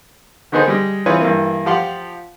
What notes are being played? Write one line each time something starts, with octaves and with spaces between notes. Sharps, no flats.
D3 D#3 B3 D#4 G#4 C5
G3 G#3
E3 C4 F4 G#4 B4 C#5
G2 E3 A#3
F3 G4 F5 F#5 C6